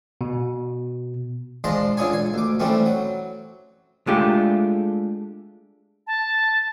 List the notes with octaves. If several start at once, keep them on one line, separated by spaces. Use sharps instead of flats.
B2
F3 G#3 D4 A#5 C6
C#2 D3 F4 G#4 C#5 G#5
G#5
D2 D6
E3 G3 A3 C4 C#4
F#3
G#3 A3 D4 F4 G4
A5